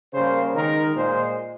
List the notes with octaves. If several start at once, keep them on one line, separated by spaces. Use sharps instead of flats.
C#3 G3 A#3 C5
D#3 G#3 A#4
A#2 G#3 C5